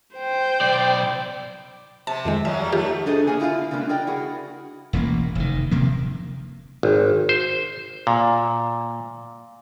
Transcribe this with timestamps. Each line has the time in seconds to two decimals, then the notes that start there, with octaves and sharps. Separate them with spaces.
0.15 C5 G5
0.61 B1 D5
2.07 C3 C4 A5
2.25 F2 D#3 G#3
2.45 F3 F#3 G#3 E5
2.61 F#3 G3
2.72 D#2 A3 F4 G4
3.06 D4 G#4 A4 C5 D#5
3.27 A#3 B3 G#4 A4
3.40 D3 E4 F4 A#4 F5
3.71 C#3 G3 G#3 A#3 D4
3.89 A#4 D5 D#5 G5
4.07 E4 F#4 G#4
4.93 E1 A1 B2 A#3
5.35 F1 D#3
5.71 D1 C3 F3 A#3
6.83 G#1
7.29 C5
8.07 A#2